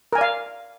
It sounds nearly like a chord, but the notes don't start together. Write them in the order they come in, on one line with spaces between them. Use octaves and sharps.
A#4 G#5 D5 F5